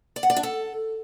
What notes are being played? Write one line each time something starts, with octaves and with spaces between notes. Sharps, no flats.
D5
F#5
D5
D4
A4